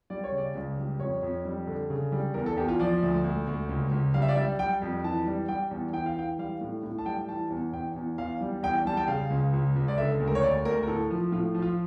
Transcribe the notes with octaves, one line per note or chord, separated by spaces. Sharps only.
G3 D5
C#5
C#3
D5
C#2
G3
F2 C#5
F2
G3
D3
C#3
G3
E2 A#4
A4
E2 G4
F4
F3 D5
D2
D2
D2
C#2
C#2
G3 F5
E5
D5
G3 E5
G3 G5
F2
E3 A5
G3
G3 G5
E2
E3 G5
F5
E3 G5
G3 F5
A2
A2
A5
G3 G5
E3 A5
E2
E2 G5
E2
E2 F5
G3
E2 G5
G3 A5
G5
C#3 F5
C#2
C#2
C#2
D5
D3 E5
D2
A#4
C#5
D2 D5
D2 A#4
A#4
A2 A4
F3
A2 F4
F3
F4